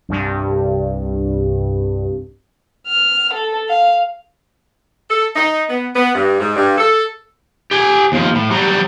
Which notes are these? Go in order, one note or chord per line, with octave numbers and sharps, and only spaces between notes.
C2 G2
F6
A4
F5
A4
D#4
B3
B3
G2
G#2
G2
A4
G4 G#5
D#2 F3
A2
F#3 G3